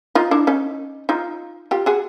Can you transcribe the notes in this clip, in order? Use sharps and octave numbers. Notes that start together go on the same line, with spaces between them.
D#4 F4
D4 E4
C#4 D#4
D#4 F4
F4 G4
F#4 G#4